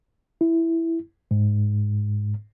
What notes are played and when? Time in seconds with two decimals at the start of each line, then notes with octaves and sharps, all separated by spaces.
0.41 E4
1.31 G#2